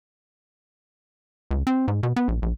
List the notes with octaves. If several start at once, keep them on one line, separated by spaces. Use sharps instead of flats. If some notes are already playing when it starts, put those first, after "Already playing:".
C#2
C4
G#2
B2
B3
A#1
A#1